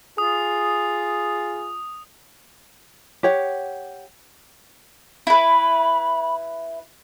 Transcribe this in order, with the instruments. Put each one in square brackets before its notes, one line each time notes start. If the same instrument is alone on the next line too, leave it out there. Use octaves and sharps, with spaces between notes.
[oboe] F4 [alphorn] G#4 [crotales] D#6
[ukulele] G4 C#5 F#5
[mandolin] E4 B4 [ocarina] B5